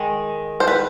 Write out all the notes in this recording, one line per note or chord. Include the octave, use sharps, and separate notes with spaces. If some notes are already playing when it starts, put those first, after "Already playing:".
Already playing: D#3 G#3
C5
B4